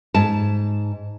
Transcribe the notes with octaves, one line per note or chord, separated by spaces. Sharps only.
G#2 A5